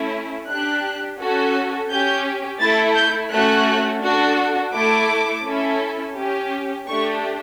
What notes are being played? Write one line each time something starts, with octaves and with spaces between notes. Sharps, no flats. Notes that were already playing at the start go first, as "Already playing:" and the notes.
Already playing: A3 C#4 E4
D4 G4 F#6
C#4 F#4 A4
C#4 G4 G6
A3 E4 A4 A6
G6
A3 C#4 F#4 F#6
D4 F#4 A4
A3 E4 A4 D6
C#4 E4 A4
C#4 G4
A3 D4 G4 C#6